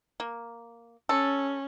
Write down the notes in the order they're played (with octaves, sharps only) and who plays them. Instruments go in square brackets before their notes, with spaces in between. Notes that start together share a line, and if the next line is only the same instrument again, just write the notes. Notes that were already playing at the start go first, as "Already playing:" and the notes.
[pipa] A#3
[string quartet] C#4 [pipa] A4